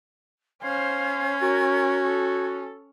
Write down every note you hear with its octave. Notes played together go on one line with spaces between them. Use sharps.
C#4 C5 F5 G#6
F#4 A#4
A4